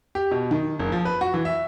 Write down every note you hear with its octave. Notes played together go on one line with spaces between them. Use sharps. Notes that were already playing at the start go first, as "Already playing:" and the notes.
G4
B2
D#3
F#1
F3
B4
F#4
E3
E5